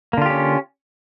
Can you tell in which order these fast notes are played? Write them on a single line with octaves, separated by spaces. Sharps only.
A#3 D3 F4 G4 C#4